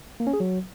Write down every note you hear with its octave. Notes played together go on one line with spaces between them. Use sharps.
A#3
C#4
G#4
F#3